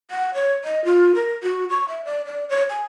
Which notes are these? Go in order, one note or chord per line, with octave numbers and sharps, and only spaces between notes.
F#5
C#5
D#5
F4
A#4
F#4
C#6
E5
D5
D5
C#5
G#5